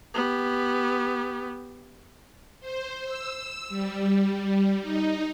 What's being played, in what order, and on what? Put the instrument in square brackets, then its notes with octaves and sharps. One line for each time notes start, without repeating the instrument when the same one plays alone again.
[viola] B3 G4
[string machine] C5
E6
G3
D#4